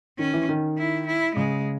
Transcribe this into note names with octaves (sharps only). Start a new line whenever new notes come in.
D#3 C#4
E3
D#3
E4
E4
C#3 G#3